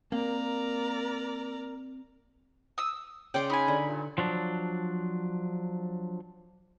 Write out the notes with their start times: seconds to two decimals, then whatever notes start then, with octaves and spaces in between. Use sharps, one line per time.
0.12 A#3 C4 A#4 D5 A#5
2.78 D#6 E6
3.34 C#3 D5 G5 C6
3.50 D#4 G#5 B5
3.68 D3
3.87 G2 A#2
4.18 F3 F#3 D4